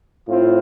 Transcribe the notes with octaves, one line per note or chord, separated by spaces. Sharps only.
A2 C4 F4